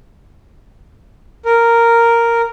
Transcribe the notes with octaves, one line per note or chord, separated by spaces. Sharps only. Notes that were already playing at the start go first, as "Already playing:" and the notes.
A#4